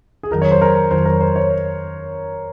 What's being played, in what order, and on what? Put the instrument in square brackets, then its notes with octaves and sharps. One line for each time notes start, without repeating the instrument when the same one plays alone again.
[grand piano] G#4
[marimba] F2 D#3 F#3 [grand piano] A#4
[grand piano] C#5
C5
A#4
[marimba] F2 D#3 F#3 [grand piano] C5
[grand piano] A#4
C5
C#5